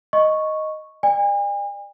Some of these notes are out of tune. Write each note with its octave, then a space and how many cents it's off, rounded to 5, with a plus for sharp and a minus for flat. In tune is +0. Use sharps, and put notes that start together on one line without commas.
D#5 +0 C#6 -5
D5 +25 G#5 -45